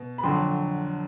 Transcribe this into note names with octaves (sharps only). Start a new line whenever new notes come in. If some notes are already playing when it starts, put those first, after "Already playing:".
Already playing: B2
B5
F2 D3 F#3 C6